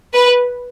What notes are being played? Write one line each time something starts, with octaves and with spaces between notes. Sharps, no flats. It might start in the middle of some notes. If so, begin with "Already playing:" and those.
B4